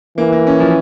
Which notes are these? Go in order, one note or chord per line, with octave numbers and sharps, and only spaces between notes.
E3 A#3
A#3
C#4
F3